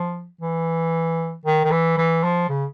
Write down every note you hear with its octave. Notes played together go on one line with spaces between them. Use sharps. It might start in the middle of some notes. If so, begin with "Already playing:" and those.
Already playing: F3
E3
D#3
D#3
E3
E3
F3
C#3